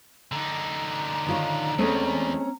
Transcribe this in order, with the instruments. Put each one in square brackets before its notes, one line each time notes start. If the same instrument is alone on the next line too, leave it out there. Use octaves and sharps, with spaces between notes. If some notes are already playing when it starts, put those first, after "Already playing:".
[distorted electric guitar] D3 D#4 [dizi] A#5
[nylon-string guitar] D#3 F4 C#5
[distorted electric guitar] E2 [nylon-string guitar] G#3 A3 [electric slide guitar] C4 C#4